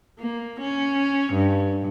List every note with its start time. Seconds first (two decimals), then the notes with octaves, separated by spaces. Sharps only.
0.19 A#3
0.61 C#4
1.34 G2